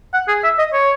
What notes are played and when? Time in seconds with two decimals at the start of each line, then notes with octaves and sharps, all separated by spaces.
0.14 F#5
0.28 G#4
0.44 E5
0.58 D#5
0.73 C#5